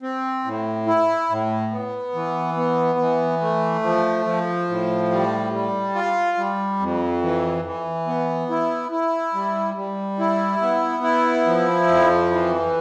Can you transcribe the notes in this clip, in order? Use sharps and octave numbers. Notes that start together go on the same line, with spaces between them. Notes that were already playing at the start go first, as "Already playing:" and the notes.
C4
A2
E4
A2
B3
E3
B3
E3
A3
F3
F3
A2
G3
G3
F4
G3
F2
E3
E3
B3
E4
E4
G3
G3
E4
B3
E4
F3
F2
E3